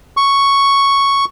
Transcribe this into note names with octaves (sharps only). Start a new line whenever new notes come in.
C#6